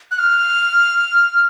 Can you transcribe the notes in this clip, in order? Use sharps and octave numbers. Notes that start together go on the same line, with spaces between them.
F#6
F6